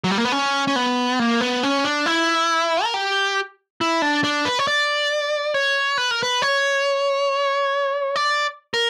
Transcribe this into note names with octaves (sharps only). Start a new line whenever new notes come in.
F#3
G3
A#3
B3
C#4
C#4
B3
A#3
B3
C#4
D4
E4
A#4
G4
E4
D4
D4
B4
C#5
D5
C#5
B4
A#4
B4
C#5
D5
A#4